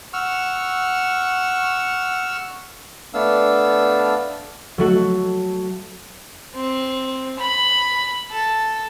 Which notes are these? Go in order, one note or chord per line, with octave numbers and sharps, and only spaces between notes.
F#5 C#6 E6 F6
A3 B3 D4 F5 E6
F#3 A3 F#4
C4
B5
A4